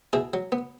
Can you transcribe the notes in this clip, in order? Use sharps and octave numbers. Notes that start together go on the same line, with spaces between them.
B2 E4 G#4
F#3
B3